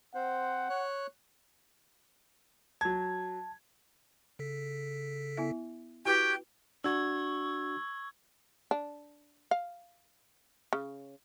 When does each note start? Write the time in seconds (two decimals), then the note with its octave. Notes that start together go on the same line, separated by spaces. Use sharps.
0.15 C4 C5 F#5
0.70 C#5 F#6
2.81 F#3 A5 G#6
4.39 C#3 A4 B6
5.37 B3 E4 E5
6.06 E4 F#4 G4 B4 G5 C#6 F#6 G#6
6.84 D4 F#4 C#6 E6 G#6
8.71 D4
9.51 F5
10.73 C#3